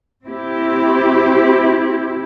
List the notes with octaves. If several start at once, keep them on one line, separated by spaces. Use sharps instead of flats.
C4 E4 G4